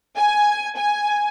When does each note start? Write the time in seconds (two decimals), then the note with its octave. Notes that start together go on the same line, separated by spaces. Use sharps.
0.17 G#5
0.77 G#5